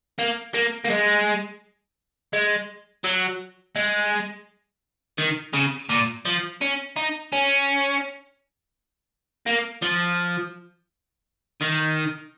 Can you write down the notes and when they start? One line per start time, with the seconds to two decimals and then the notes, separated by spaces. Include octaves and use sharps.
0.19 A#3
0.54 A#3
0.85 A#3
0.90 G#3
2.33 G#3
3.04 F#3
3.76 G#3
5.18 D#3
5.54 C#3
5.89 A#2
6.25 F3
6.61 C#4
6.96 D#4
7.32 C#4
9.47 A#3
9.82 F3
11.61 D#3